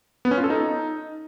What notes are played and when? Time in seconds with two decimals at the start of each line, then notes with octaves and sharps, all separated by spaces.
0.25 B3
0.31 C#4
0.37 F4
0.44 A4
0.50 D#4